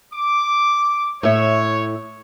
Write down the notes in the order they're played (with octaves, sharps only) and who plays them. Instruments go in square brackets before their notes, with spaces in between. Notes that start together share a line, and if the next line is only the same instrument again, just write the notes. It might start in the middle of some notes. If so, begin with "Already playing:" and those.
[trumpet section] D6
[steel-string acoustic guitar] A2 E5 [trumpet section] C#5